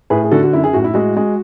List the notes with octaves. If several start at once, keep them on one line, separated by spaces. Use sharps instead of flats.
A2 G#4 B4
G#4
D3 F#4 A4
F#4
F#2 E4
G#4
A2 F#4
E4
G#3 F#4
G#3